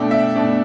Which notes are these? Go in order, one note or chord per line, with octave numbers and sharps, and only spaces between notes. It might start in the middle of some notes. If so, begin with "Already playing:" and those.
Already playing: B2 A3 D4 G5
E5
B2 A3 D4